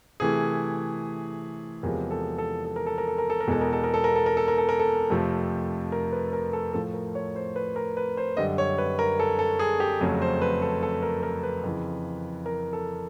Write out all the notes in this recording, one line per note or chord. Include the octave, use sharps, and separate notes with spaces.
C3 E3 A3 G#4
E2 C3 F3 G#3 A#4
A4
A4
A4
A#4
A4
A#4
A4
A#4
A4
A#4
E2 B2 G#3 A4
A#4
A4
A#4
A4
A#4
A4
A#4
A4
A#4
A4
A#4
A4
F2 C3 F3 A3
A#4
B4
A#4
A4
A2 F3 A3 A4
A#4
C#5
C5
B4
A#4
B4
C5
F#2 D3 G3 D#5
C#5
B4
A#4
A4
A4
G#4
G4
F2 C#3 F#3 A3 G#4
C5
B4
A4
A4
A#4
A#4
B4
F2 C#3 E3
A#4
A4